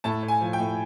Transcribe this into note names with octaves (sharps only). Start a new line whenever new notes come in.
A2 A5
A2
G#5
F3
G5
A2